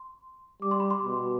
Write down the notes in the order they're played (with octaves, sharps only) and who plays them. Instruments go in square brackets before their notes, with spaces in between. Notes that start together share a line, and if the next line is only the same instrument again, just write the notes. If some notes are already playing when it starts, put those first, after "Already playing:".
Already playing: [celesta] C6
[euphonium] G3 [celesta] D6
[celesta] C6
B5
C6
[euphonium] B2